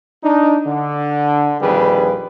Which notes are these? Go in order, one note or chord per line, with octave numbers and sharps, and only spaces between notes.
D4 D#4
D3
A#1 F2 D#3 G3 G#4 B4